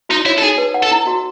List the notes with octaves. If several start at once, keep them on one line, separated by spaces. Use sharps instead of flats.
D#4 F#4
E4 C#5
A4
D#4 G#4
B4
F#5
A4
E4
F#4